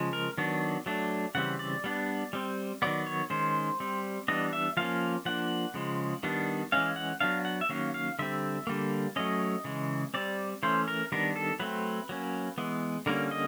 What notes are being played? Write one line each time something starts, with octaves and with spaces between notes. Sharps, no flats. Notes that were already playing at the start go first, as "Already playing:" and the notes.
Already playing: C#3 F3 G#3
A#4
D#3 F#3 B3 D4
F#3 A3 D4
C#3 E3 G3 C4 F#5
D5
G3 B3 D4
G3 C4
D#3 F#3 B3 D5
C#5
D#3 G#3 C#4 C5
G3 C4
E3 G3 B3 D4 D#5
E5
F3 A#3 C#4 F5
F3 A#3 D4 F#5
C#3 F3 G#3
D#3 G3 B3 D4
E3 G#3 C#4 F5
F#5
F#3 B3 D4 F5
F#5
E5
D#3 F#3 A#3 C#4 F5
F5
D3 G3 C4 E5
D3 G3 A#3
F#3 A3 C#4 D#5
C#3 E3 G#3
G3 C4 D5
E3 A3 C#4 C5
A#4
D#3 G3 B3 D4 A#4
A4
F#3 A3 C4 B4
F#3 A#3 C#4
E3 G#3 B3
D3 G3 A#3 C#4 A#4
D#5